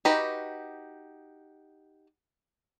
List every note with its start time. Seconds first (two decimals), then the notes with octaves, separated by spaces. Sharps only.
0.05 D#4 F#4 G4 B4